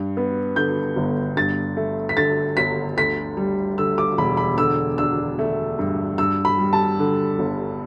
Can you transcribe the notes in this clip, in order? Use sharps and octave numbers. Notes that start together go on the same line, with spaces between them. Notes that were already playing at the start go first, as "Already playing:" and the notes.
Already playing: G2
B3
D3 G6
G1
G2 A6
A3
B6
D3 A6
G1 B6
D2 B6
G3
D3 E6
D6
E1 B5
B5
D3 E6
D4 E6
A3
G2
G2 E6
B5
G3
A5
D3
G1